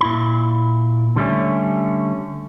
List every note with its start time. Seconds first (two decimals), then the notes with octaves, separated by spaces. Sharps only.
0.01 A#2 E4 B5
1.16 D3 G3 A3 C#4